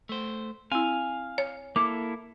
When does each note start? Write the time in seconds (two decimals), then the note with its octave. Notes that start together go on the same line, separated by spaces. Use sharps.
0.09 A3 C5
0.72 C4 E4 F5 G#5
1.38 C#5
1.76 A#3 E4 A4 D6